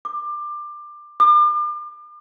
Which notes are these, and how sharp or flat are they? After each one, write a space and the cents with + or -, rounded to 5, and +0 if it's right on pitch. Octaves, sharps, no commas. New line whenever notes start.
D6 +20
D6 +35